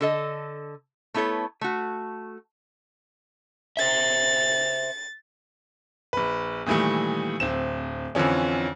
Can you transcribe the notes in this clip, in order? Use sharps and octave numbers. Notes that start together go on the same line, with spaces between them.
D3 A4 D#5
A3 B3 E4 A4 C#5
A3 F#4
C5 E5 A6
A#1 B4
A#2 D#3 E3 G3 A3
D1 C4 E7
F2 D3 E3 F3 C#4